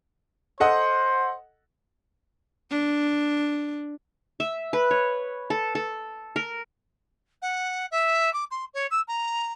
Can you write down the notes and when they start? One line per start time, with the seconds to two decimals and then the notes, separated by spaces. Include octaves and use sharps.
0.60 A4 C5 D#5 F#5
2.71 D4
4.40 E5
4.73 B4
4.91 C#5
5.50 A4
5.75 A4
6.36 A#4
7.42 F#5
7.91 E5
8.33 D6
8.51 C6
8.74 C#5
8.91 E6
9.08 A#5